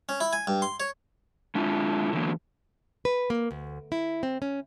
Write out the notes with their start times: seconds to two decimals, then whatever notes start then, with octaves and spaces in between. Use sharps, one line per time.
0.09 C#4
0.20 E4
0.33 G#5
0.47 G2
0.62 C6
0.80 C#5
1.55 G#3 D4 E4 F4
2.13 D3 E3 F#3 A#3
3.05 B4
3.30 A#3
3.51 D2
3.92 E4
4.23 C4
4.42 C#4